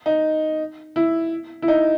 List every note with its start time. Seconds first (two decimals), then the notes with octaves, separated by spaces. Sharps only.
0.06 D#4
0.96 E4
1.62 E4
1.68 D#4